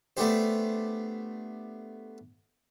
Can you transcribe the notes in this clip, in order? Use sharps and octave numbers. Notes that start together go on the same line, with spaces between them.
A3 B3 D4 G4 C5